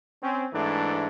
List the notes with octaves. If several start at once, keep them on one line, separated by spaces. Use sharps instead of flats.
C4 C#4
G#2 E3 A3 D4